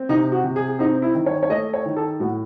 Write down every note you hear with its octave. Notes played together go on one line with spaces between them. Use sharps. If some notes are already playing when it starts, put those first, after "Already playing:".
Already playing: C4
C3 D#4
F#4
C3
G#4
C4 D#4
E4
D#3
C#5
C#5
A3 D#5
C#5
D#3
A4
A2 F#4